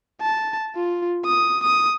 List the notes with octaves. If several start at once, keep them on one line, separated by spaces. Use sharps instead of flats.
A5
F4
D#6
D#6